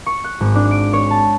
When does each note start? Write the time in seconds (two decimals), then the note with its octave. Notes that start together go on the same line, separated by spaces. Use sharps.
0.06 C#6
0.24 F#6
0.41 G#1
0.56 D4
0.71 D7
0.93 C#5
1.11 A5